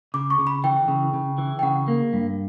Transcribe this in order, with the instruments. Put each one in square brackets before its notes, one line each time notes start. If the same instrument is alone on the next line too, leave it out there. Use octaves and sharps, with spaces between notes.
[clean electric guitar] C#3 [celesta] D6
[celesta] C#6
[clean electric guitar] C#3
[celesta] B5
[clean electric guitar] E3 [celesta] G5
[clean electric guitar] C#3
C#3
E3
[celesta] G5
[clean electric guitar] C#3 [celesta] F#5
[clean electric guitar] A#3
G2